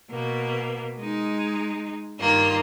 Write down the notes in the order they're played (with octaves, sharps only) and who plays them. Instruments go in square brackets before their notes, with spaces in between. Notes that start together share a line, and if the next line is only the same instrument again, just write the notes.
[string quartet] B2 A#3
G#3 D#4
G2 D#3 A#3 F4